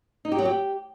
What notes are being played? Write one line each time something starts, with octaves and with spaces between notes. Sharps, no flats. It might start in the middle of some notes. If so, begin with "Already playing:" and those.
D#4
G4
F#3
G4